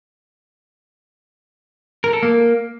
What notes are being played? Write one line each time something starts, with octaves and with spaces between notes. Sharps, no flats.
A#4
A4
A#3